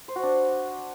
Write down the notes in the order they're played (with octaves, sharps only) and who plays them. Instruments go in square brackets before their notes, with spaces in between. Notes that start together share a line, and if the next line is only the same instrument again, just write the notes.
[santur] C5
F#4
D4